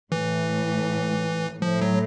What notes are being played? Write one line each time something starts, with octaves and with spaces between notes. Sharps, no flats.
A2 E3
A2 F3
F#3